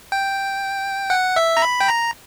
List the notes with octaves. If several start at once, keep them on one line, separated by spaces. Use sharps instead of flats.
G5
F#5
E5
A#5
B5
G5
A#5